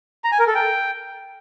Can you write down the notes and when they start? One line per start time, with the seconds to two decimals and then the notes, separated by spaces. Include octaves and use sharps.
0.24 A#5
0.32 G#5
0.39 A#4
0.47 A4
0.55 G5